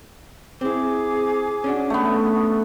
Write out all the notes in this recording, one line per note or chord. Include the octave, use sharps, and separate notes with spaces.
C4 E4 G#4 D6
C#4 D4 F#4
A3 B3